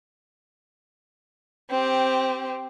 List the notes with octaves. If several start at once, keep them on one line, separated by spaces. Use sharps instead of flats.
C4 G4